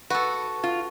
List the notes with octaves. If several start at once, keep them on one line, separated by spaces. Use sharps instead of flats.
F#4 A4 B4
F4